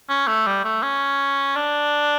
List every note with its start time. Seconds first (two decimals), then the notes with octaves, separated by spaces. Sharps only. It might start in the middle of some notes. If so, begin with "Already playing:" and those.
0.09 C#4
0.27 A3
0.47 G3
0.64 A3
0.82 C#4
1.56 D4